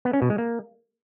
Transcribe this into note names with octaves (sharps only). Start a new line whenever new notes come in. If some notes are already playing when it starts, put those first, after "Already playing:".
B3
C#4
B2
G#3
A#3